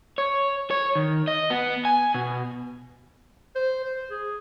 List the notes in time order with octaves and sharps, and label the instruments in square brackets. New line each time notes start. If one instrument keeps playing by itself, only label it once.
[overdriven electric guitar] C#5
C#5
D#3
D#5
B3
G#5
B2
[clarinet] C5
C5
G#4